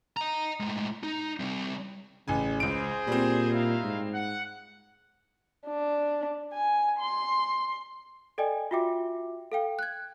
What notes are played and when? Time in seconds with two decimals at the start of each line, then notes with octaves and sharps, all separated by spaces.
0.17 D#5 A#5
0.60 A2 G#3
1.03 D#4
1.40 G3 C4
2.28 A1 C#3 G#5
2.60 C#2 G#4 C5 D7
3.07 A#2 G3 C4
3.51 D#4 E4 F5
3.83 G#2
4.14 F#5
5.67 D4
6.54 G#5
7.00 C6
8.38 A4 D5 D#5 G5 G#5
8.71 F4 F#4 E5 G5 D6
9.52 A4 F5 G5
9.79 F#6 G#6